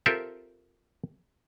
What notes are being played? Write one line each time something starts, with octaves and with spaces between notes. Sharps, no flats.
C4 F4 G4 A4 A#4 E5